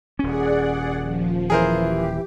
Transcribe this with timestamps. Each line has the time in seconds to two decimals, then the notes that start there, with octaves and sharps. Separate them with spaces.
0.19 D#1 C#4 G#4 D5 F#5
1.02 F3
1.50 E3 G#4 A#4 C5
1.82 G4